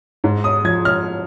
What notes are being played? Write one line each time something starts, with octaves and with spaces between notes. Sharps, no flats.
G#2
D#6
F3 G#6
F6